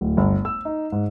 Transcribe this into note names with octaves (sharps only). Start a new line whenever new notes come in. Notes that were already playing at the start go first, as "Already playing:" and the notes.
D1
G1
E6
D#4
G#2